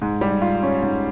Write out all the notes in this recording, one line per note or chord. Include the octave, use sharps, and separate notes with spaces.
G#2
G3
F4
C#4
G#2